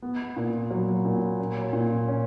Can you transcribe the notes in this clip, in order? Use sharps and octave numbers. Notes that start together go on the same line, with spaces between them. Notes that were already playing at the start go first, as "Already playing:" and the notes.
B3
A#2
F#3
A#2
C#4
A#2
C#4